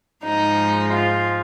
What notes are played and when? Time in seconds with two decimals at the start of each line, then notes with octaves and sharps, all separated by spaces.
0.23 G#2 F3 G#3 D#4
0.92 F4